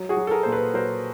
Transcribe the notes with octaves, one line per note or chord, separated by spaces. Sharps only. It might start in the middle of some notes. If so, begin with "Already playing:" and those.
Already playing: F#3
F#4 G#4
F#3
A4
G#4 A#4
A#2 C5
A4 B4
F#3 A#4 C5